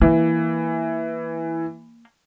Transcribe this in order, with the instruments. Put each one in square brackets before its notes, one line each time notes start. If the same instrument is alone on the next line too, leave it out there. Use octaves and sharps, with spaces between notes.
[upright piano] E3 [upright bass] A#3